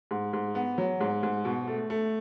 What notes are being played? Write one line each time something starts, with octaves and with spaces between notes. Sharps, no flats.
G#2
G#2
B3
F#3
G#2
G#2
B2
A3
A3